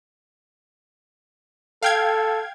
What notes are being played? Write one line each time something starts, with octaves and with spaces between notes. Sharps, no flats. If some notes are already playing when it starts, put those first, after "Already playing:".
A4 F5 G5 G#6